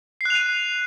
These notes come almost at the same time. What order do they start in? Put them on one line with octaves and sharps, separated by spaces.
C7 F#6 F7 D#7